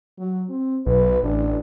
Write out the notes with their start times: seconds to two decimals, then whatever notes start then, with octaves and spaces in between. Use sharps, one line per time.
0.19 F#3
0.49 C4
0.86 B1 B4
1.23 A1 D4